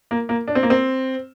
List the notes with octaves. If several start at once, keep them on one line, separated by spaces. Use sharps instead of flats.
A#3
A#3
D4
C4
A#3
C4